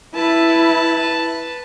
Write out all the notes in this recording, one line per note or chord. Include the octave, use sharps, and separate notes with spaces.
E4 B4 A5